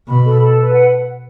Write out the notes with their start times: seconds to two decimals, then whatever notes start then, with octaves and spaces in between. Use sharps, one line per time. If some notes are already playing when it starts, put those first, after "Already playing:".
0.08 B2 B5
0.25 A4
0.42 A4
0.57 B4
0.74 F#5